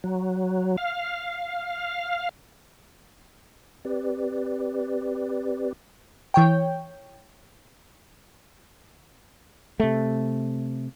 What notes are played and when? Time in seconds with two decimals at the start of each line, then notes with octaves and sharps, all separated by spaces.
0.04 F#3
0.78 F5
3.85 C4 G4 B4 D5
6.34 E3 C#5 G5
9.80 C3 A3